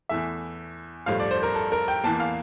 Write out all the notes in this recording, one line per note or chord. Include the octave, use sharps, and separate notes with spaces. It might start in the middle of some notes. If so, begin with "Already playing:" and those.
E2 E3 A3 E5
A1 G2 F3 A3 F5
D5
C5
A#4
A4
A#4
G5
E2 E3 A#3 A5
F5